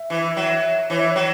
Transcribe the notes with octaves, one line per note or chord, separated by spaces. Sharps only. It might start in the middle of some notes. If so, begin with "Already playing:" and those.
Already playing: E5
E3
F#3
E3 C#5
E5
F#3 C#5